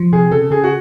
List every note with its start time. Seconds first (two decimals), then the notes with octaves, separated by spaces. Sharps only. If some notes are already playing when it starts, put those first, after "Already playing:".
Already playing: F3
0.12 C3 G#4
0.31 C#3 A4
0.51 C#3 G#4
0.64 F#4